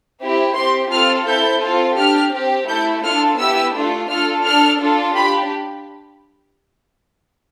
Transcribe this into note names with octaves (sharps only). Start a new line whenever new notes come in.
C4 E4 G4
C4 G4 C6
C4 F4 A4 F6
C4 E4 A4 G6
C4 F4 A4
D4 G4 F6
C4 G4
A3 E4 A4 G6
D4 F4 A4 F6
B3 E4 G4 E6
A3 D4 F4 A4
D4 F4 A4 F6
D4 A4 F6
D4 F4 A4
D4 G4 B5